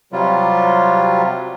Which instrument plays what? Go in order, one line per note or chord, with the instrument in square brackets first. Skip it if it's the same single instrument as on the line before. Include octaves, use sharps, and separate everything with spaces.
[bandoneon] C3 F#3 G3 F4